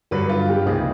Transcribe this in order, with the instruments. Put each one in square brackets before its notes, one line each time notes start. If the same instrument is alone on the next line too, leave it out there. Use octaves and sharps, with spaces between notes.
[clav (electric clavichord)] G2 D3 F#3 [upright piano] B4
[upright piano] F4
G4
[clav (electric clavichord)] C#2 C3 F3 A#3 D#4 [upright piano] G#4